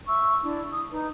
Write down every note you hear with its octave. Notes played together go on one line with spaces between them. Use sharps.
E5 C#6 E6
D4 E4
D#6
D#4 B4